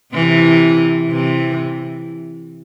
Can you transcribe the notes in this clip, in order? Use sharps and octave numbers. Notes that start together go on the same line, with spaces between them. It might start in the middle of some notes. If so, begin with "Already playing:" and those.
C3 E3
C3 E3